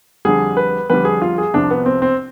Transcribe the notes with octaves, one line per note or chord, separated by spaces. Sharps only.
F2 D3 G3 G#4
B4
F2 D3 G3 B4
G#4
F4
G#4
C2 C3 F3 D4
B3
C4
C4